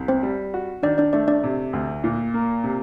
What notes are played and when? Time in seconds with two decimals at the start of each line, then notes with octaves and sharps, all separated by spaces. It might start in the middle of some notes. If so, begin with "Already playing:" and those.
Already playing: C2
0.08 C4 C5
0.23 G3
0.54 F#4
0.83 D#3 D4 D5
0.98 D4 D5
1.13 A3 D4 D5
1.28 D4 D5
1.43 C3
1.73 D2
2.04 A#2
2.34 A#3
2.64 C3